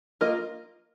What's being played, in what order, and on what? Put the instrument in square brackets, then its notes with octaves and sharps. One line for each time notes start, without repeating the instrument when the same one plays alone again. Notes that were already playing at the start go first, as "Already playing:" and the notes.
[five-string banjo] A#3 F4 A#4 D#5